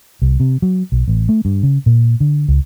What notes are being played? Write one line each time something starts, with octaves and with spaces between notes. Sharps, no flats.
C2
C3
F#3
B1
A1
A3
G2
C#3
A#2
D3
C#2